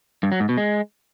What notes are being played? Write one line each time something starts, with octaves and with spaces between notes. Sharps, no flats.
G2
F#3
G#2
B2
G#3